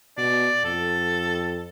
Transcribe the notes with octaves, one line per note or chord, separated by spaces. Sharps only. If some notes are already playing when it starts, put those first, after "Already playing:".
B2 D5
F2 A4